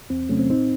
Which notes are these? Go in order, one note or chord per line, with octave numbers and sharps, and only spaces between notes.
E2 C4
C3 F#3 A3 C#4
C4
A2 C4 D#4